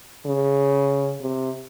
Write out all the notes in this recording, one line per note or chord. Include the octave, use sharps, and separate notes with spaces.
C#3
C3